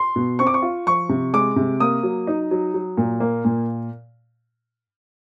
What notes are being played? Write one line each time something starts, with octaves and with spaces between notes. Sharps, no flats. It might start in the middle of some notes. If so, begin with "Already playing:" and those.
Already playing: C6
B2
C4 C#6
D6
C#6
F4
F3 C#6
C3
G#3 D6
C3
A#3 D#6
F#3
D#4
F#3
F#3
A#2
A#3
A#2